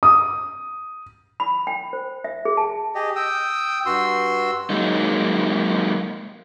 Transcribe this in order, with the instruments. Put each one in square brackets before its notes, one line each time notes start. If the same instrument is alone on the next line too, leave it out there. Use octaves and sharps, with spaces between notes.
[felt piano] D#6
[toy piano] B5
G5
C5
E5
G#4
A5
[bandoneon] G4 G#4 D#5
G5 D#6 E6
G2 F#4 C6 E6
[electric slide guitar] F#3 G#3 A#3 D#4